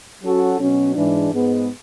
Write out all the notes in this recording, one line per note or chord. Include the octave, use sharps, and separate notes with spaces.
F#3 C#4 F#4 A4
B2 F#3 C#4
G#2 E3 G#3 D4
G#2 G#3 B3